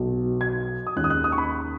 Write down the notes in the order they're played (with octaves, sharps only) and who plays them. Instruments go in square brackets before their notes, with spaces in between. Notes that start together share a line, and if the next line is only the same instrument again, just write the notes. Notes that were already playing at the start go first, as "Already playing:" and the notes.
Already playing: [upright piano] B1 B2 F#3 B3
G#6
D#6
D#2 D#3 G#3 C#4 F#6
D#6
F#6
D#6
C#6
B5